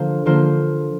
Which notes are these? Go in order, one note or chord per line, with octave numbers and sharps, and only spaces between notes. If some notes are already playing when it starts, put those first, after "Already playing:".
Already playing: D3 F3 A#3 F4 C5
D3 F3 A#3 F4 C5